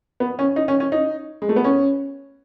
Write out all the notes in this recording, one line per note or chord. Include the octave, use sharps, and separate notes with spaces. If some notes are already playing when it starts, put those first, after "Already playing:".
B3
C#4
D#4
C#4
C#4
D#4
G#3
A3
B3
C#4